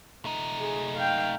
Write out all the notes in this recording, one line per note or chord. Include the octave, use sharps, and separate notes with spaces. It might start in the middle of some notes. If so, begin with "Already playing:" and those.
A3 D#4
G#4
F5 G5